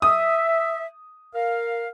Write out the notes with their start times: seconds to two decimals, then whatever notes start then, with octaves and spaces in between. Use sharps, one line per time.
0.02 E5 D#6
1.34 A#4 F5